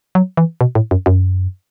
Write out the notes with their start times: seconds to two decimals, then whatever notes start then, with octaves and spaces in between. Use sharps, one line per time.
0.15 F#3
0.37 E3
0.61 B2
0.75 A2
0.91 F#2
1.06 F#2